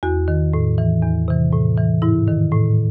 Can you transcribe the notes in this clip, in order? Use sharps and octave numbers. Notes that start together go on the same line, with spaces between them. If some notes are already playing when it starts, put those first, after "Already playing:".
E2 F#4
D#3
A2
E3
E2
C3 E3
A2
E3
G#2 E4
D#3
A2